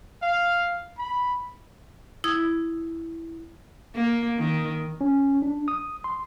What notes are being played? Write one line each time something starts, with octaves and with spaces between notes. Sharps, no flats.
F5
B5
E4 D#6 E6 G#6
A#3
D#3
C#4
D4
D#6
C6